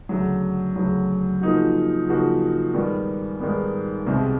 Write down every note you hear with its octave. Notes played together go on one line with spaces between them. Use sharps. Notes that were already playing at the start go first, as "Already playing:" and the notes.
D2 C#3 F#3
D2 C#3 F#3
C#3 F3 A#3 D#4 F#4
C#3 F3 A#3 D#4 F#4
G#2 D#3 G3 B3
G#2 D#3 G3 B3
C2 B2 G#3 C4